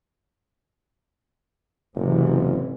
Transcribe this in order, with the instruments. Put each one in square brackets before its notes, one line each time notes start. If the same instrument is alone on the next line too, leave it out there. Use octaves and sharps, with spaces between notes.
[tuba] F#1 [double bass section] G#2 C3 E3